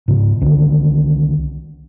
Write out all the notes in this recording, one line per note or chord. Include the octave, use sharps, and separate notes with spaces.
G#2 C#3
C2 D3 D#3